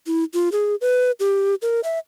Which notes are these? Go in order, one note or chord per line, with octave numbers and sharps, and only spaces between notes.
E4
F4
G#4
B4
G4
A#4
E5